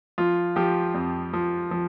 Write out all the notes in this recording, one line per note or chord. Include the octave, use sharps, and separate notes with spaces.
F3 F4
F3 G4
F2
F3
F3